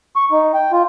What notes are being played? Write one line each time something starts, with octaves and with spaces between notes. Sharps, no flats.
C#6
D#4
G5
F4